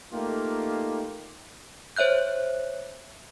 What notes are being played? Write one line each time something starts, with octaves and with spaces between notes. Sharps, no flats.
A3 A#3 D#4 F4 G4
C5 C#5 E5 F#6 G6